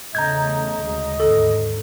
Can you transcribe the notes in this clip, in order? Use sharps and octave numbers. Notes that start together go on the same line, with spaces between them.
E2 C#3 A3 D#5 A#5 G6 G#6
D2 C#3 G#3
D#2 G#2 D3 A4